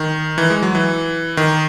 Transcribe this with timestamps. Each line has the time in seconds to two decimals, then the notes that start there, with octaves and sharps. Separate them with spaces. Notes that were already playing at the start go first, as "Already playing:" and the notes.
Already playing: D#3
0.38 E3
0.50 G#3
0.63 F#3
0.75 E3
1.37 D#3